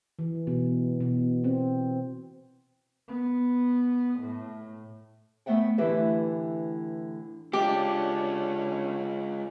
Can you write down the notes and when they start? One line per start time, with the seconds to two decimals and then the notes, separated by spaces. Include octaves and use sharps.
0.19 E3
0.47 B2
1.01 B2
1.44 C4
3.08 B3
4.19 A2
5.46 A3 B3 E5 F#5 G5
5.78 A2 D3 E3 G4 B4 E5
7.53 G#3 C#4 D4 F4 G4